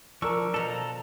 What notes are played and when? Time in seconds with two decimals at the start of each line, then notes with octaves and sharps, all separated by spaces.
0.22 F3 D4 A#4 C#6 E6
0.54 B2 F3 A4 A#5